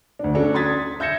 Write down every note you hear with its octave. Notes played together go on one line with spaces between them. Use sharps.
D2 D4
C#4 D4 F#4 A4
C6 D#6 G#6 A6 B6
E5 G6 G#6 A#6 C#7 E7